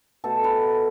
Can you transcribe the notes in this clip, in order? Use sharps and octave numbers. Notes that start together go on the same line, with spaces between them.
B2 A3 A4
B4